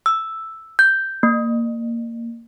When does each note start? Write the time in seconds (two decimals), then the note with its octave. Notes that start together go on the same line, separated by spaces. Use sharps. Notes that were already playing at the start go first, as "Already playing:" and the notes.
0.06 E6
0.79 G6
1.23 A#3